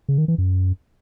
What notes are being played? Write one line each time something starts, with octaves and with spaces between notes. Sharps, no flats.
C#3
D#3
E3
F#2